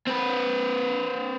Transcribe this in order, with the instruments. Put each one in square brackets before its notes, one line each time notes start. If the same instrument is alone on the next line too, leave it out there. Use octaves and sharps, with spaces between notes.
[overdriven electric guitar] C4 B4